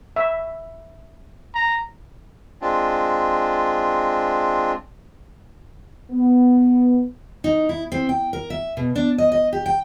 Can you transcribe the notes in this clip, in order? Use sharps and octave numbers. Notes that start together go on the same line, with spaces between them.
E5
A#5
G#3 C4 D4 F4
B3
D#4
E4
C4
G5
A#4
E5
B2
D4
D#5
D#5
G4
G5